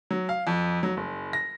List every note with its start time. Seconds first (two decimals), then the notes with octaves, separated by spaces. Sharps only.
0.11 F#3
0.29 F5
0.47 F2
0.83 F#3
0.97 F#1
1.33 A#6